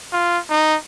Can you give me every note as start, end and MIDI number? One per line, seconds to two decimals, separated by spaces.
0.13 0.38 65
0.50 0.76 63